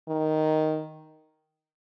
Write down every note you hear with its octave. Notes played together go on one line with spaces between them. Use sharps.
D#3